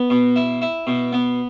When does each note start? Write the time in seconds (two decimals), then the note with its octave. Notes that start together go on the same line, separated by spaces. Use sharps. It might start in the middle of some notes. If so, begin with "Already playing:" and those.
Already playing: B3
0.10 B2
0.36 E4
0.62 E4
0.87 B2
1.13 B3